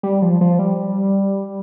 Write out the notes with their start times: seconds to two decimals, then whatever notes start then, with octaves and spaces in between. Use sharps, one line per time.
0.03 G3
0.22 F3
0.41 F3
0.59 G3